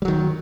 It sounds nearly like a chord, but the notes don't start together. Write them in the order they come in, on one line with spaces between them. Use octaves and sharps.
G3 F#3 D#3